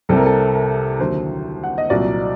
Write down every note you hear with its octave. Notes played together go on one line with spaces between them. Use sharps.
C2 C3 G3 A4
A#4
A4
A#4
D#2 D3 F#3 C5
F#5
D#5
C2 A#2 F#3 D5